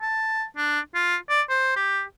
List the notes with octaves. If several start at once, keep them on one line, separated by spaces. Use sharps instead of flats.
A5
D4
F4
D5
C5
G4